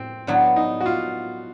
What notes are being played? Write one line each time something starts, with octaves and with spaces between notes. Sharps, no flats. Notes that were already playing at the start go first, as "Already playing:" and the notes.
Already playing: A2 C4
A2 F#3 B3 D4 E4
D#4
F#4
F4